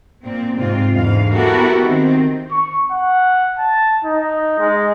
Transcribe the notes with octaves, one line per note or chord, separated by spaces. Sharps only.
A#2 C4
G#2 C3 C4 F4
E2 G#2 D3 F5
B3 E4 F#4 G4 A4 A#4
D#3 C4
C#6
F#5
A5
D#4
G#3